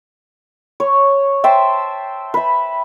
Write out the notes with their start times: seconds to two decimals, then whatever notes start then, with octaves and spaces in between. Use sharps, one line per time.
0.80 C#5
1.44 C5 E5 G5 A5
2.34 B4 E5